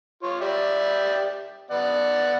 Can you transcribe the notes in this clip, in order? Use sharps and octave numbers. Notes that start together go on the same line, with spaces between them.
F4 C#5
G4 D5 E5
B3 D5 F#5